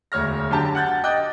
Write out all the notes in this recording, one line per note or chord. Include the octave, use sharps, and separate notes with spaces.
E1 D2 C#5 F6 A#6
F#2 D3 G4 A5
F#5 F#6 G6 A6
D#5 G5 D6 F#6